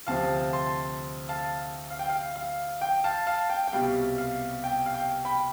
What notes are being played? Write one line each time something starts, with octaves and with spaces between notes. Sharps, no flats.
D2 C3 F3 F5 A5
A5 C6
F5 A5
F5
G5
F5
F5
G5
F5 A5
F5 A5
G5
G5
C2 B2 G3 F5
F5
G5
F5
G5
G5 B5